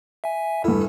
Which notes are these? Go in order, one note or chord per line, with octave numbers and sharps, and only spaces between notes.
E5 G#5
E2 G2 E4 A4